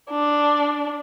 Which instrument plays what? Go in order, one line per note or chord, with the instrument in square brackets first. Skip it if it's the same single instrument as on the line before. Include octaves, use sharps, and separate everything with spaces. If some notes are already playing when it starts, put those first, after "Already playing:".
[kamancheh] D4